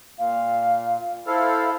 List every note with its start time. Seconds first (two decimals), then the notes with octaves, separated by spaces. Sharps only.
0.19 A#2 F5
1.27 E4 A4 C5 F5